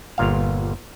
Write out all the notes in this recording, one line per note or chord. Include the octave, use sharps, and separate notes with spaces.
G1 A#2 F5